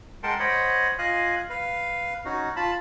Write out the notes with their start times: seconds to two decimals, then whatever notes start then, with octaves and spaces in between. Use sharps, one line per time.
0.23 G#3 A#4 F#5 G5 A5 C6
0.40 C5 C#5 D#5 F#5 B5
0.98 F4 D#5 F5 G#5 F#6
1.50 B4 F5
2.25 C#4 D#4 F#4
2.56 F4 A5 B5